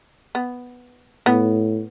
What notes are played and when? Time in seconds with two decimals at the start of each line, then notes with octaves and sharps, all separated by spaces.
0.35 B3
1.26 A2 B3